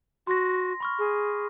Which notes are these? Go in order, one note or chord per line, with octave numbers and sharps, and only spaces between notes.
F#4 C6 A#6
B5 C#6 F6
G#4